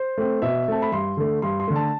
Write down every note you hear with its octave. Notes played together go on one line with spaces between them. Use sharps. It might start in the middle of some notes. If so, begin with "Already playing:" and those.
Already playing: C5
A3 C4
B2 E5
A3 C4 A5
B5
G2 C6
D3 A3
G2 C6
C6
D3 A3
A5